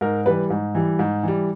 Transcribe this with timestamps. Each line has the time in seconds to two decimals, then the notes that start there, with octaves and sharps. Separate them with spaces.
0.01 G#2 A#4
0.26 E3 G3 B4
0.50 G#2
0.75 E3 G3
0.99 G#2
1.23 E3 G3